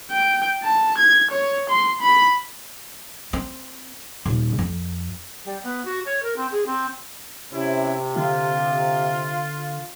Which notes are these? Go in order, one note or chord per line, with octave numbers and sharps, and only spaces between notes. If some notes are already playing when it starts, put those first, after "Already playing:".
G5
A5
G#6
C#5
C6
B5
C4
D#1
F2
G3
B3
F#4
C#5
A#4
C4
G#4
C4
C3 C#4 E4
D3 F4